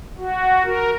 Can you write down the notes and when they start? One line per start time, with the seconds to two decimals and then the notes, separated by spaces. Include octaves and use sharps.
0.18 F#4
0.64 A#4